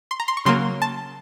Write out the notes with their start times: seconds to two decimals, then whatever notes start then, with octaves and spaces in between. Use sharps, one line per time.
0.11 C6
0.20 A#5
0.28 C6
0.37 C#6
0.45 C#3 F#3 A#3 C6
0.82 A5